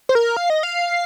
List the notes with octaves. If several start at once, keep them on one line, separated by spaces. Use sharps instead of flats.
C5
A#4
F5
D#5
F5